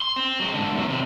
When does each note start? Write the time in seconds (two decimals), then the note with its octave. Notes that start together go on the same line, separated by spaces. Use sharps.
0.02 C6
0.16 C4
0.40 F#3 G#3
0.54 G#2 D3
0.74 E2 F#3
0.88 D#2 C3